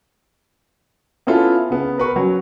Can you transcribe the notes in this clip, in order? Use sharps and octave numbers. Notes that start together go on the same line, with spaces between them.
B3 C#4 E4 F4 A4
C#3 B3
A#4 B4 C#6
F#3 C#4